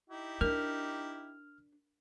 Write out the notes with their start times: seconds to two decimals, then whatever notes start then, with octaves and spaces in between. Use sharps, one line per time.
0.10 D#4 E4 G4
0.41 D4 A#4 F6